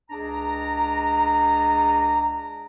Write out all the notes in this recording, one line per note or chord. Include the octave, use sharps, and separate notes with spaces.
C#2 D4 G#4 A#5